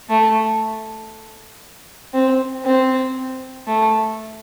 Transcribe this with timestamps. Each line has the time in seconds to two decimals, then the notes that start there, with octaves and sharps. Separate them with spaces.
0.10 A3
2.14 C4
2.65 C4
3.68 A3